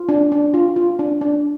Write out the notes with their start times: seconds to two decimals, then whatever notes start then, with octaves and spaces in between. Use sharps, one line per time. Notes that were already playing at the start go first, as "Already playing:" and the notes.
Already playing: F4
0.09 D4
0.32 D4
0.54 F4
0.76 F4
0.99 D4
1.21 D4